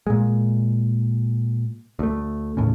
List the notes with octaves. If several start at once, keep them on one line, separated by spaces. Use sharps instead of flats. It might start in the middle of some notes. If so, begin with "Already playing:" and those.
A#2 G#3
D2 A3
D#2 A2 C#3